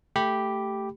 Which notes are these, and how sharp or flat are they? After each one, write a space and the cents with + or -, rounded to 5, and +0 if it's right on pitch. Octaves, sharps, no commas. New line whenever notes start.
A3 +5 G4 +0 B5 +0